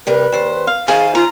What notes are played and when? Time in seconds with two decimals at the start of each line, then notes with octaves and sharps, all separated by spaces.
0.07 C3 G3 A#4 B4
0.32 D#2 C5
0.67 F5
0.88 D#3 G#4 C5 F5 G#5
1.15 F4 A#5